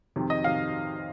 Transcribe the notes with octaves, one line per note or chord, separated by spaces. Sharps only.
F2 C3 D#3
D#5
C3 D#3 F5